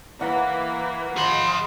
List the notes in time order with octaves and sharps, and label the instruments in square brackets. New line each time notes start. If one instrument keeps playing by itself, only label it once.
[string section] E3 A#3 [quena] B4 [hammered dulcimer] F#5
[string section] F3 D#5 [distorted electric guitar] G#4 B5 [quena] C6